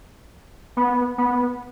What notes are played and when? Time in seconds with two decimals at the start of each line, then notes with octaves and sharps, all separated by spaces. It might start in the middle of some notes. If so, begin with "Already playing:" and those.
0.77 B3
1.18 B3